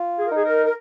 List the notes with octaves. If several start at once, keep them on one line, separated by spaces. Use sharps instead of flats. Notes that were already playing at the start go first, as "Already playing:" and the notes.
Already playing: F4
G#4
A#4
D#4 G#4
A#4
A#4